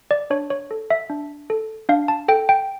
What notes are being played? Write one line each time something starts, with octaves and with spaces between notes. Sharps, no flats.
D5
D4 C#5
C#5
A4
E5
D4
A4
D4 F5
A5
A4 G5
G5